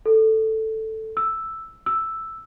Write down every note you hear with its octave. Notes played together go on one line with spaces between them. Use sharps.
A4
E6
E6